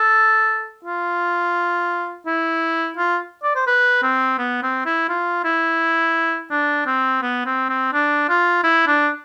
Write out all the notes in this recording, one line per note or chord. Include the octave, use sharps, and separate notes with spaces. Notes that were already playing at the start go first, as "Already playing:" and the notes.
Already playing: A4
F4
E4
F4
D5
C5
B4
C4
B3
C4
E4
F4
E4
D4
C4
B3
C4
C4
D4
F4
E4
D4